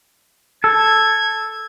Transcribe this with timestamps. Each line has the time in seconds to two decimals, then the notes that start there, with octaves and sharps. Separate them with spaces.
0.64 A4 G#6